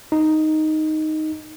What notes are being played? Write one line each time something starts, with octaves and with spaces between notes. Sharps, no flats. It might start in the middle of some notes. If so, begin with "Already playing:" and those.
D#4